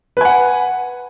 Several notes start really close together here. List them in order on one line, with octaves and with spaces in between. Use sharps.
B4 G#5 F#5